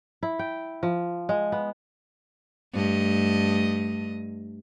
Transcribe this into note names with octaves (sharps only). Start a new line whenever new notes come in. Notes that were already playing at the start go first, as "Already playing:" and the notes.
E4
G5
F3
G#3
B3
G2 A3 D#5